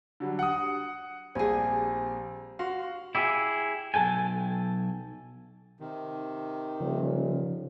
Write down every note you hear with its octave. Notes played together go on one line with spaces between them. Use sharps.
D3 F#3 G3
F#5 D#6
A#1 G3 C4 G#4 G#5
F#4 F5 C6
E4 G4 G#4
B1 A4 G5 G#5
C3 D#3
D#1 C#3 F3